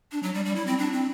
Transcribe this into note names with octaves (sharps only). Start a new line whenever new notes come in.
D4
F#3
G3
G3
E4
C4
D4
C4